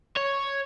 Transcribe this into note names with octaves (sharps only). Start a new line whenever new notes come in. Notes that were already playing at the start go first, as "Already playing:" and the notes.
C#5